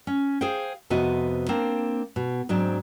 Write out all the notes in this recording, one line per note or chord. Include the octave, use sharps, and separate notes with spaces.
C#4
G#4 C5 F5 G5
F2 C3 B3 F#4 D#5
A#3 C4 D4
B2
G#2 F#3 C4 D4